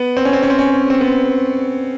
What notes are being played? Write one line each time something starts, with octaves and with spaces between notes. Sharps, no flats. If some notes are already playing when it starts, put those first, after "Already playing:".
Already playing: B3
C4
C#4
C4
C#4
C4
C#4
C4
B3